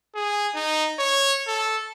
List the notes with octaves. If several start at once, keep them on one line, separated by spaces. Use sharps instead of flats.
G#4
D#4
C#5
A4